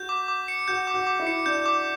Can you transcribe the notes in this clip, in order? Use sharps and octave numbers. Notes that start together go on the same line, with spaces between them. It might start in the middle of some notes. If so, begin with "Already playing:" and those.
Already playing: F#4 G6
D6
D6
C#7
F#4 G6
D6
F#4
D6
E4
C#7
D4 G6
D6